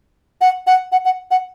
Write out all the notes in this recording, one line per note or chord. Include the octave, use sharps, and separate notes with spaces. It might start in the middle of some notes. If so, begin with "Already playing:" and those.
F#5
F#5
F#5
F#5
F#5